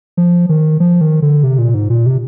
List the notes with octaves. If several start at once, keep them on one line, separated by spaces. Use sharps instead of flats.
F3
D#3
F3
D#3
D3
C3
A#2
G#2
A#2
C3